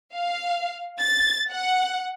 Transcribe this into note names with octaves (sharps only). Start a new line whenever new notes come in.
F5
A6
F#5